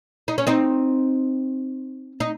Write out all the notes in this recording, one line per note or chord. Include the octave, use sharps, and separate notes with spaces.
D#4
C#4
C4 D#4
D#4